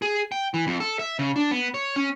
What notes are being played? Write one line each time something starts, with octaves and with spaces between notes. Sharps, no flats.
G#4
G5
E3
F2
A4
E5
C#3
D4
B3
C#5
C#4